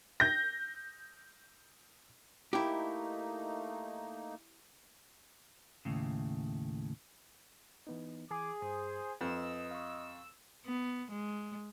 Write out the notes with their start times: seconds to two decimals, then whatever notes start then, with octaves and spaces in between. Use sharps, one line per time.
0.20 G6 A#6
2.53 A3 A#3 D#4 E4 G4
5.85 D#2 A2 C#3
7.87 E3 B3 D#4
8.30 E3 G#4 D6
8.62 G2 C5 G#5 D#6
9.21 F2 B4 D#5 E6
9.71 F5 C#6
10.65 B3
11.11 G#3